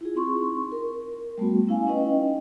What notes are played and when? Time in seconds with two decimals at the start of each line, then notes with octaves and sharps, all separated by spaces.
0.01 E4 F4 G#4
0.15 C4 D#4 C6 C#6
0.72 A#4
1.38 G3 A3 B3 F#4
1.67 C#4 E4 F5 G#5
1.87 C#4 D#4 B4 D#5 G5